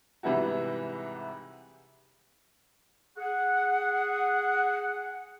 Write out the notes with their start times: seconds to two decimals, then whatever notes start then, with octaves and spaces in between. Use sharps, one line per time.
0.23 G#2 C3 E3 G3 E4 F#4
3.18 G#4 F#5